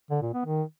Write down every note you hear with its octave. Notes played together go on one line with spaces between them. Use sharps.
D3
A#2
B3
D#3